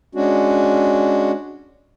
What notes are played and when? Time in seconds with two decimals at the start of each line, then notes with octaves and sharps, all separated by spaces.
0.15 G#3 C#4 D4 F#4